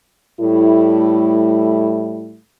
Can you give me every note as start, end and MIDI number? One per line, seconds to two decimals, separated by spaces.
0.40 2.40 45
0.40 2.40 55
0.40 2.40 57
0.40 2.40 64